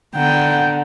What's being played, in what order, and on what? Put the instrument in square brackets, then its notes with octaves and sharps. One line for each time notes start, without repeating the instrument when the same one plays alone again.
[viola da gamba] D3 [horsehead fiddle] B3 G5 [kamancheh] F#5 A#5